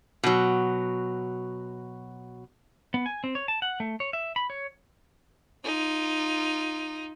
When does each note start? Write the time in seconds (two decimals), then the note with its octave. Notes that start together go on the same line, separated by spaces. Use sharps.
0.23 B2 F#3
2.94 B3
3.06 G#5
3.24 C4
3.35 C#5
3.48 A5
3.62 F#5
3.80 A3
4.00 C#5
4.13 E5
4.36 B5
4.50 C#5
5.64 D#4 F4